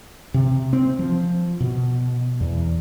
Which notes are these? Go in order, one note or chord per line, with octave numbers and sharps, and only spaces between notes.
C3
C4
F3
B2
E2